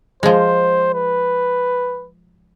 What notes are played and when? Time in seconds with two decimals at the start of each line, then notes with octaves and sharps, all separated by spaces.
0.23 F3 G#3 C5
0.94 B4